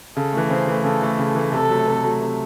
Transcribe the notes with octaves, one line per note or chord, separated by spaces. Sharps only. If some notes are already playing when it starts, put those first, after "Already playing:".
C#3 A4
E3 A3
C#3 C5
E3 A3
C#3 A4
E3 A3
C#3
E3 A3
C3 A4
F#3 A3
C3
F#3 A3
C3